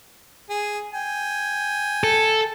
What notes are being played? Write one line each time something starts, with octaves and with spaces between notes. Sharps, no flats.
G#4
G5 G#5
A4